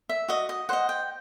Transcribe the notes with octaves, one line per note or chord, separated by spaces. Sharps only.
E5
F#4 D#5
D#5
C5 D#5 F#5
G5